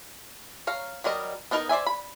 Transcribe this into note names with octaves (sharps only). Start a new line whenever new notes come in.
C#5 F5 A#5
F#3 G3 A#4 D#5
B3 D4 D#4 A#4 D#5
C5 D5 E5 G#5
B5